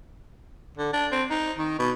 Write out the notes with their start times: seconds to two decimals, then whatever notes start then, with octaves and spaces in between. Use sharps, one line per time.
0.77 D3
0.93 D4
1.12 C4
1.30 D#4
1.58 D#3
1.79 B2